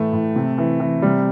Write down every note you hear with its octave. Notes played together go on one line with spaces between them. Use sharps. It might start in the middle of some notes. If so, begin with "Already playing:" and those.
Already playing: A2 E3 A3
A2
C3
E3
E3
C3 G3